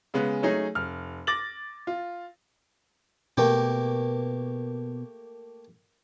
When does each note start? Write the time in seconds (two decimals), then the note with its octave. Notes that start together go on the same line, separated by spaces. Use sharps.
0.14 C#3 G#3 B3
0.42 F#3 A3 C#4 D#4 G#4
0.75 F1 F6
1.27 D6 A6 A#6 F#7
1.87 F4
3.37 B2 A3 A#3 G4